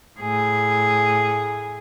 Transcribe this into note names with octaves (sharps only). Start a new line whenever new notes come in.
A2 G#4